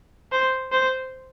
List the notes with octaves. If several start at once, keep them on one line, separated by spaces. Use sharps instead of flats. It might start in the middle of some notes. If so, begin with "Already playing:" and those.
C5
C5